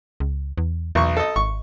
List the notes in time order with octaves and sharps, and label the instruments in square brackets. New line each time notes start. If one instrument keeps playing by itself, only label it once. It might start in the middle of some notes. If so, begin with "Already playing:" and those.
[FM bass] C#2
E2
[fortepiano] B1 C#6 [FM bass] E2
[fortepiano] A4 D#5
[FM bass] G#1 [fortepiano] C#6